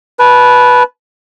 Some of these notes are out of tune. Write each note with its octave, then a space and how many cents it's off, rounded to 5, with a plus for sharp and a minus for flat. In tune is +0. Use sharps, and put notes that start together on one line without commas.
B4 -5 A5 -30